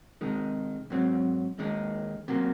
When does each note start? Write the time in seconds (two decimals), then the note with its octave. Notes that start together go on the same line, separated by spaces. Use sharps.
0.21 C3 D#3 G#3 D#4
0.90 G#2 F#3 C4
1.59 D#2 D#3 G#3 D#4
2.28 C3 F#3 A#3